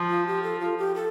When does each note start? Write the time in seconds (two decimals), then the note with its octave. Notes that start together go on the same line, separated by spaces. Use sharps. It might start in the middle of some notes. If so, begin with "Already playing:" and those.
Already playing: F3
0.10 F4
0.26 G4
0.43 A4
0.60 F4
0.78 G4
0.95 A4